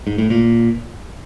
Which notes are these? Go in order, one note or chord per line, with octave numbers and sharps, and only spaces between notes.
G#2
A2
A#2